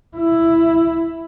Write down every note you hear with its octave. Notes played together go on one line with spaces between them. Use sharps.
E4